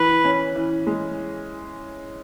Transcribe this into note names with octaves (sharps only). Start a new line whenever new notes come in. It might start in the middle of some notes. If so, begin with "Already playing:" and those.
Already playing: E3 B4
C#4
E3
G#3